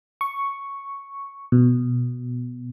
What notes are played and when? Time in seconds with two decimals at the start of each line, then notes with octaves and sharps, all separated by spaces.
0.21 C#6
1.52 B2